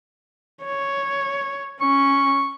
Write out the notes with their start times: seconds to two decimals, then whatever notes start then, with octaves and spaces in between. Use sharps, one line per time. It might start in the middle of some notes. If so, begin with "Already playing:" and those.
0.64 C#5
1.81 C#4 C#6